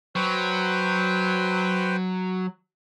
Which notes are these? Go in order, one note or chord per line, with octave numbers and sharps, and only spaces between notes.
F#3 B4 C5 G5